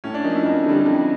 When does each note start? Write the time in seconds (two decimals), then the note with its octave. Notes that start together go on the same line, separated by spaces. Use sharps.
0.04 A2 C#4
0.14 D4
0.24 F3 A#3 D#4
0.35 E4
0.45 F2 D#4
0.66 D3 G3
0.86 F2